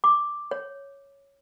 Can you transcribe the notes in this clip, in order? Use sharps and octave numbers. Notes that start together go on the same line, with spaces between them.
D6
C#5